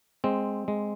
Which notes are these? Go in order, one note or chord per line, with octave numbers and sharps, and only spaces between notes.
G#3 C4
G#3